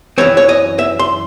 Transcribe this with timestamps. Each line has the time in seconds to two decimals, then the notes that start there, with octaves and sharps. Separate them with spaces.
0.18 F#2 E3 C4 C#5
0.37 C#5
0.49 D#5
0.79 E5
0.99 C6